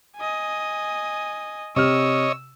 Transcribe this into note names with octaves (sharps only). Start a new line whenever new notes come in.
D#5 G#5
C3 C#5 D#5 E6 F6